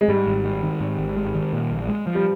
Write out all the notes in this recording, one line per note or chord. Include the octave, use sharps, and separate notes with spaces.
G#3
G#2 G3
G#1
G#3
D#3
G#2
G#1
G#3
D#3
A#2
A#1
G#3
F3
G3